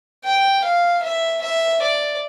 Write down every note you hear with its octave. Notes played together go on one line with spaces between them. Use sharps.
G5
F5
E5
E5
D5